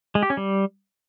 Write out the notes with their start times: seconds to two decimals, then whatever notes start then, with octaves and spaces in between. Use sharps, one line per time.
0.15 G#3
0.23 G4
0.30 C#4
0.37 G3